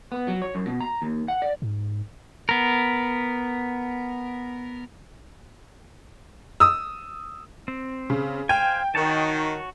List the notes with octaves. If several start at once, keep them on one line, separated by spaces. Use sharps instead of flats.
B3
F#3
C#5
F#2
B2
A#5
D#2
F#5
D5
G#2
B3 A#4
D#6 E6
C4
C#3
C5 F5 G5 G#5
D#3 F#4 C#5 A5